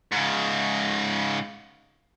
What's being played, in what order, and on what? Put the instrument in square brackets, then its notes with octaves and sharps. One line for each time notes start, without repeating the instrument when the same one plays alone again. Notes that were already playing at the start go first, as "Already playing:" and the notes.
[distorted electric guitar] G#2 C#3